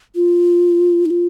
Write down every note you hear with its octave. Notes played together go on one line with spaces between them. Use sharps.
F4
D#4
F4